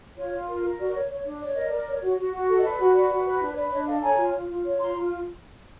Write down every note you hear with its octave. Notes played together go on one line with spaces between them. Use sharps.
F4 C#5
F4
A#4
A#4
F#4 D5
C#5
C#5
D4
C#5 D5
A#4 D#5
A#4 D5
C#5
F#4
F#4
F#4
A4
D#5
B4 D5
F#4
B4 D5
F#4
B4
D4
C#5
B4 D5
D4 C#5 D#5
A4 D#5 F5
C#5 G#5 A#5
F4
F4
F4
C#5
F4 A#5 C6
F4